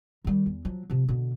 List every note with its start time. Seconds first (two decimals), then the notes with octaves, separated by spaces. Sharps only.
0.25 D#3 G3
0.46 E2
0.65 F3 F#3
0.90 C3 F3
1.09 B2 D3